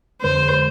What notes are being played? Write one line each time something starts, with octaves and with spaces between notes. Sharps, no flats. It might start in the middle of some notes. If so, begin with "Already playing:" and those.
F2 D3 G#3 C5